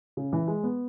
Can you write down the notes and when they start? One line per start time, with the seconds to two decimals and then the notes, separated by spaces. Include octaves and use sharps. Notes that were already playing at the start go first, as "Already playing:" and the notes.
0.17 C#3
0.33 E3
0.48 G#3
0.64 B3